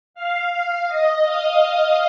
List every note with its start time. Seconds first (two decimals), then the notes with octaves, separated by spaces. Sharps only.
0.14 F5
0.87 D#5
1.24 F5